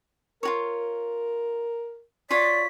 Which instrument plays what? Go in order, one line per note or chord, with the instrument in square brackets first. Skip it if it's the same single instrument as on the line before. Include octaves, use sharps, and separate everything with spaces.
[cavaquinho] F4 F#4 C#5 [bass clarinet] A#4
[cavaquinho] F4 F#4 C#5 [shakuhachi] D5 [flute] B6